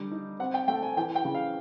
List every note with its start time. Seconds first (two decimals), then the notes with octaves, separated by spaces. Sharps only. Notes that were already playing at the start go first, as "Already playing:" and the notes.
Already playing: D3 G3
0.11 D#4
0.39 C4 F#5
0.54 G5
0.68 A3 G5
0.83 G#5
0.97 E3 G5
1.15 G5
1.25 C#3
1.35 F5